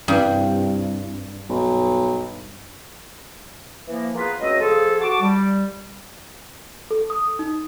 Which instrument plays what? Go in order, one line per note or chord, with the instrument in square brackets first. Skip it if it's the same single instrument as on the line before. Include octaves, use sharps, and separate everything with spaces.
[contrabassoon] C2 [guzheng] G2
[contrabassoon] B1
[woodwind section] E3 F3 A#3
A#3 B3 F4 G#4 B4
C#2 F#3 A3 C4 D#5
F3 G#4 A4
F#4 A5 D6
G3
[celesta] A4
D#6
D#4